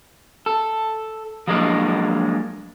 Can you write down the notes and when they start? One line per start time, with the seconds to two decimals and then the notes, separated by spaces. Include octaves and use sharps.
0.46 A4
1.47 F3 F#3 G#3 A#3 D4